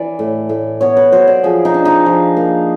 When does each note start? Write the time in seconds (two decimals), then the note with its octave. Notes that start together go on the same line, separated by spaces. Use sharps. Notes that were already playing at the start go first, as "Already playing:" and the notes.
Already playing: E3 D5
0.19 A2
0.49 A2
0.81 B3 C#5
0.97 B4
1.12 F#3 C5
1.28 D5
1.43 F3 G#4
1.65 D#4
1.74 D4
1.85 D#4
2.06 F3
2.37 A#3